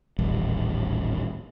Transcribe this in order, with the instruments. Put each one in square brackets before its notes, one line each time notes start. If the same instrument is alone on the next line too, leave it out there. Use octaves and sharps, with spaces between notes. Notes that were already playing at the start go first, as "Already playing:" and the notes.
[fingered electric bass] D#1 A1 G3